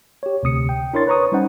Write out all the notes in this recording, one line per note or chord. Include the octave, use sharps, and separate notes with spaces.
G4 C#5
D2 C3 D#6 C#7
G5
D4 E4 A#4 C#5 C6 A6
B4 C#5 A#5 C#6 D#6
G3 C#4 D#4 C5 F#5